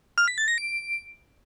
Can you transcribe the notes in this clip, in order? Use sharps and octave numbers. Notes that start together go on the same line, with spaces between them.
F6
B6
A6
A#6
D7